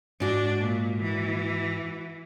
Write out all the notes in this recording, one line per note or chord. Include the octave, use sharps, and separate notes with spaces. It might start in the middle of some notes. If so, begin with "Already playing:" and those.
G#2 D4 F#4
A#2
E3